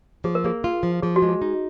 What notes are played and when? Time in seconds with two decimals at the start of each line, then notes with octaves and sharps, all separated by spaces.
0.24 F3 G#4
0.35 A#4
0.44 A#3 G#4
0.64 F4
0.83 F3
1.03 F3 G#4
1.16 F#4
1.22 G#3
1.29 G#4
1.42 D#4